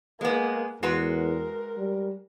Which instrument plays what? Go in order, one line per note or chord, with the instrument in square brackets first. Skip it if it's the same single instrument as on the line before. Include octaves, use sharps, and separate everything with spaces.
[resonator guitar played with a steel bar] G#3 B3 [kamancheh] A#3 G#4
[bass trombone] E2 [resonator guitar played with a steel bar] G#3 F#4 B4 [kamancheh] A#4
[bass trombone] G3